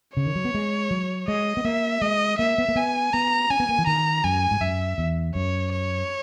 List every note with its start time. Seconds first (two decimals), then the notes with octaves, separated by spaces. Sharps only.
0.17 C#3 C#5
0.26 D#3
0.35 F#3
0.45 B3
0.54 G#3
0.91 F#3
1.28 G#3 D#5
1.57 B3
1.65 A#3 E5
2.02 G#3 D#5
2.39 A#3 E5
2.58 B3
2.68 A#3
2.76 B3 G#5
3.13 B3 A#5
3.50 C#4 G#5
3.60 B3
3.69 A#3
3.78 E3
3.87 D#3 A#5
4.24 F#2 G#5
4.51 G#2
4.61 F#2 E5
4.98 E2
5.35 F#2 C#5
5.72 C#5